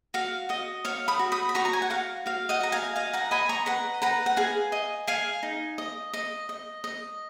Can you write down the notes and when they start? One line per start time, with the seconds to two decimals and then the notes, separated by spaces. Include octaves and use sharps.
0.14 F#4 F5
0.49 F#4 D#5
0.85 C#5 F5
1.08 B5 D#6
1.19 F#4
1.32 B5 D#6
1.49 B5
1.55 F#4 A#5 C#6
1.65 A#5
1.73 G#5
1.82 F#5
1.90 F#4 F5
2.26 F#4 F5
2.49 D#5 F#5
2.61 F#4 A#5
2.72 F5 G#5
2.96 D#5 F5 G#5
3.13 F#5 A#5
3.31 D#5 G#5 B5
3.49 A#5 C#6
3.66 B4 F#5 A#5
4.02 B4 F#5 A#5
4.26 F#5
4.37 G#4 F5 G#5
4.72 D#5
5.07 G#4 F5 G#5
5.43 D#4
5.78 D#5
6.13 D#5
6.49 D#5
6.84 D#5